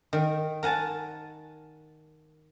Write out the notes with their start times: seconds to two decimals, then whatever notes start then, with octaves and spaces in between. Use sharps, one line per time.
0.13 D#3
0.63 A#4 F#5 G#5 A5